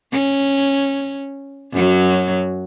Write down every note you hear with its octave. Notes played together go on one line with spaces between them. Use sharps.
C#4
F#2 F#3